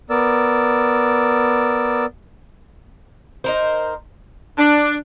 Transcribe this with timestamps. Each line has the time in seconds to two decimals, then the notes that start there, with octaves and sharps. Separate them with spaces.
0.10 B3 A#4 D5 E6
3.44 D#4 A#4 C5
4.58 D4